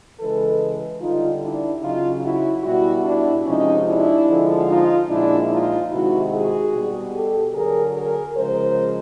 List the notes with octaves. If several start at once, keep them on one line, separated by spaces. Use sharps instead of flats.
C#3 E3 G#3 A4 B4
D3 G3 D#4 F4
D4 E4
C#3 F#3 D#4 F4
E4 F#4
B2 G3 E4 F#4
D4 E4
C3 F3 G#3 C#4 D#4
D4 E4
D3 F3 G#3
D#4 F4
A#2 F3 G#3 D4 E4
D#4 F4
C3 D#3 G#3 E4 F#4
F#4 G#4
B2 G3
G4 A4
D3 F#3 G#4 A#4
G#4 A#4
C#3 F3 G#3 A#4 C5